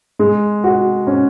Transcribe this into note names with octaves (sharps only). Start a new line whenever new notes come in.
G#3
F#4
C#4